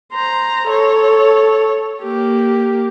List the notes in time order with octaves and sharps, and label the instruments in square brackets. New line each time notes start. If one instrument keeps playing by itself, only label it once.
[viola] C5 A#5
A4 C#5
A#3 G4